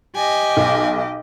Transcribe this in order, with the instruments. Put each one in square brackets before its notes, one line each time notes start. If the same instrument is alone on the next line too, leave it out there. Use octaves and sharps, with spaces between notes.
[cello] G4 D#5 [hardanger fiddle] G#5
[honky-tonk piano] B1